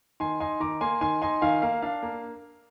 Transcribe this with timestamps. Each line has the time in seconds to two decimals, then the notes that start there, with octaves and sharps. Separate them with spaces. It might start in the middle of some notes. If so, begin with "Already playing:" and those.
0.20 D#3 G#5 C6
0.40 D#4 G#5 C6
0.60 D#3 A#5 D6
0.81 A#3 G#5 C6
1.01 D#3 G#5 C6
1.22 D#4 G#5 C6
1.41 D#3 F5 G#5
1.62 A#3 F5
1.82 D4 F5
2.02 A#3